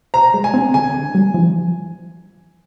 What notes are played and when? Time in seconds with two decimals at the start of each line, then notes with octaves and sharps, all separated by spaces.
0.14 C5 A#5
0.34 G#3
0.44 G#5
0.54 C4
0.74 D3 G#5
0.94 D3
1.15 G3
1.34 F3